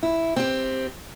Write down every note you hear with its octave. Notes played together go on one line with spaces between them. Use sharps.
E4
C4 G4